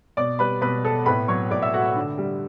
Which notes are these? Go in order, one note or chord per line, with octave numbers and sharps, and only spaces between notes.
B2 D5 D6
G3 B4 B5
B2 B4 B5
B3 A4 A5
A2 B4 B5
F#3 C#5 C#6
A2 D5 D6
E5 E6
A3 F#4 F#5
D3
G3